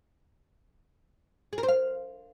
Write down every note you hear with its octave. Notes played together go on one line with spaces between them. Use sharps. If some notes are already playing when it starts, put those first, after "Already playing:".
G#4
A#4
C5
F5